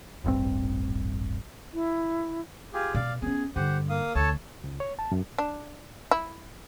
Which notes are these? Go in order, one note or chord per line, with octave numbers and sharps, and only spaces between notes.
D#1 A1 G2 C4
E4
F4 G4 G#4
B2 D5 F5
B3 C#4 G#4
G2 D3 G4 C5 F#5
A#3 F5 D#6
D2 A4 C#5 A5
C#2
C#5
A5
F#2
D4
E4